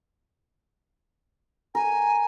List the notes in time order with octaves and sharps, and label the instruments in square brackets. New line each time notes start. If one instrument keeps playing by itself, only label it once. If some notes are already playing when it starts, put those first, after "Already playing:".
[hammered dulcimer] A#4 [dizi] G#5